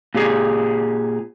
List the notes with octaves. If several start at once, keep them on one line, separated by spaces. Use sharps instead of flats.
A#2 G4 G#4